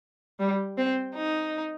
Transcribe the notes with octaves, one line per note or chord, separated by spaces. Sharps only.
G3
C4
D#4